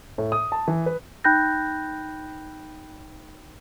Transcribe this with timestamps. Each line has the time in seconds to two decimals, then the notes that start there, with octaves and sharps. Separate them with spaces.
0.18 A2
0.32 D#6
0.52 A5
0.68 E3
0.86 B4
1.24 D#4 G5 B5 F#6 G6 A#6